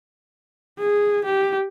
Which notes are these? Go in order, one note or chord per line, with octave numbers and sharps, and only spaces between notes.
G#4
G4